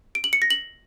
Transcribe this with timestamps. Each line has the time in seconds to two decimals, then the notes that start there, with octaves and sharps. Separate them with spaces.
0.15 D7
0.24 F#7
0.33 C#7
0.42 A#6
0.51 F#7